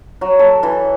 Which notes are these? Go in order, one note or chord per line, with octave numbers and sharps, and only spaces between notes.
F#3
A4
E3